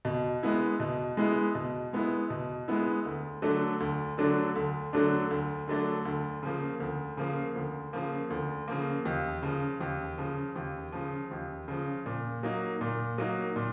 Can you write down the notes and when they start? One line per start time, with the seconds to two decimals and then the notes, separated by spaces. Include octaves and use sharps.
0.05 B2
0.43 G#3 B3 E4
0.80 B2
1.17 G#3 B3 E4
1.55 B2
1.93 G#3 B3 E4
2.30 B2
2.68 G#3 B3 E4
3.05 D2
3.42 D3 F#3 A3 D4
3.80 D2
4.18 D3 F#3 A3 D4
4.55 D2
4.93 D3 F#3 A3 D4
5.31 D2
5.68 D3 F#3 A3 D4
6.05 D2
6.43 C#3 F3 A#3
6.80 D2
7.17 C#3 F3 A#3
7.56 D2
7.93 C#3 F3 A#3
8.30 D2
8.68 C#3 F3 A#3
9.05 D#2
9.43 C#3 F3
9.81 D#2
10.18 C#3 F3
10.56 D#2
10.92 C#3 F3
11.31 D#2
11.68 C#3 F3
12.06 A#2
12.43 F#3 A#3 D#4
12.81 A#2
13.18 F#3 A#3 D#4
13.56 A#2